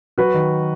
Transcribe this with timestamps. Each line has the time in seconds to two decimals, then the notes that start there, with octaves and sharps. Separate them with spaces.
0.18 F#3 F#4 B4
0.34 D#3